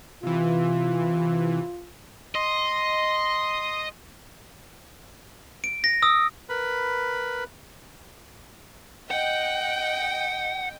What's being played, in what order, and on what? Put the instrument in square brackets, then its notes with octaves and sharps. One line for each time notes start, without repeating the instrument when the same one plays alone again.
[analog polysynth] C3 E3 [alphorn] F4
[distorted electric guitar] D#5 [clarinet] C6
[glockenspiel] D7
A#6
D#6 E6
[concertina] A#4 B4 B5
[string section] D#5 G5 [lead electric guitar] F#5